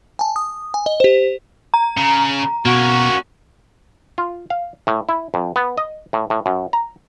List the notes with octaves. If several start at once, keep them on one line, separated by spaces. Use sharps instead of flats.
G#5 A5
D#6
G#5
D#5
G4 C5
A#5
C#3
B2 A#3 C#4 F#4
F4
F5
A2
E4
F2
B3
D#5
A2
A2
F#2
A#5